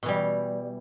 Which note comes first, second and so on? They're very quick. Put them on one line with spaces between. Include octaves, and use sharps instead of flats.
B2 E3 G3